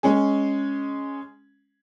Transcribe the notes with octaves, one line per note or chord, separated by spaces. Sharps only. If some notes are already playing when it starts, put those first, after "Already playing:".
G#3 C#4 G#4